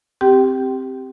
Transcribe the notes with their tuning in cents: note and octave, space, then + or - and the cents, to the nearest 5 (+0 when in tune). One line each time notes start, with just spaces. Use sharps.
C4 +0 G4 +0 G5 -25